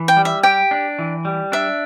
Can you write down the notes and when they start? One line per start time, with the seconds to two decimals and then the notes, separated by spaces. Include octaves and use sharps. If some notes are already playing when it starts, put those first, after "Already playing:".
Already playing: E3
0.08 G5
0.17 G3
0.25 E5
0.43 G4 G5
0.71 D4
0.99 E3
1.25 G3
1.52 D4 E5